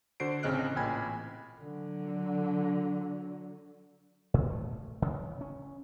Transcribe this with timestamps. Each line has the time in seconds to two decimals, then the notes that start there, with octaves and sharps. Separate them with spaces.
0.20 D3 F#4 C5 C7 D7
0.43 A1 C#3 C4 D#5 F6 F#6
0.76 A1 A#2 G5 G#5 B5 G#6
1.62 D3 F#3
4.34 A2
4.50 A3
5.02 C#3
5.41 C#4